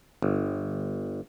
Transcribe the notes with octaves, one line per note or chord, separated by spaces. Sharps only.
G1